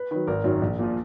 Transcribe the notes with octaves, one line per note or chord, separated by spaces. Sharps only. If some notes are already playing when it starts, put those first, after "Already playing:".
Already playing: B4
D#3 F#3 B4
G#1 A#4
F#2 D#3 F#3
A#1
A#2 F3